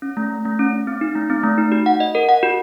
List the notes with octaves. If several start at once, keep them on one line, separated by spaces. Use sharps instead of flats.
C#4
A3
A3
A3
C#4
C#4
C4
D#4
A3
C4
A3
D#4
F#4
F#5
D#5
A#4
F#5
F#4